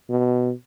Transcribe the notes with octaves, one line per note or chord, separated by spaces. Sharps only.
B2